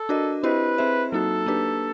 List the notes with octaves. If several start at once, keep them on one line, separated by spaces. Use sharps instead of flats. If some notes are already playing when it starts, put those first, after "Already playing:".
Already playing: A4
D4 F#4 A#4 D#5
C4 E4 G4 B4 C5 D#5
C4 E4 G#4 C5 E5
F#3 A#3 D#4 F#4 A4
A#3 D4 G4 B4